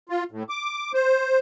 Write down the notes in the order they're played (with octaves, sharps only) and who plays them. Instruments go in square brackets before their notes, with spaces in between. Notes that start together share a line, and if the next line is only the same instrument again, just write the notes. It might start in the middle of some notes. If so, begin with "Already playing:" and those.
[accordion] F4
A2
D6
C5